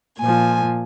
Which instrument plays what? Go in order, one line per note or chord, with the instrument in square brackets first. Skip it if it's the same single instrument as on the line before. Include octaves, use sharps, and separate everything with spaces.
[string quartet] A#2 F3 G#5